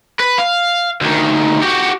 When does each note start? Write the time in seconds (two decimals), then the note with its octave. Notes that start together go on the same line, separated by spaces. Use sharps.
0.19 B4
0.38 F5
1.01 D2 D#3
1.62 F#4 G4